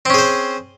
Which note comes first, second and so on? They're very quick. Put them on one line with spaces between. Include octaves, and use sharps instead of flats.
C4 C#4 G#4 C5